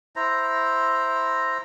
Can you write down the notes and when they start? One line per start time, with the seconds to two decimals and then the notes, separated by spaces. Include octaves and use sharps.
0.16 E4 C5 A#5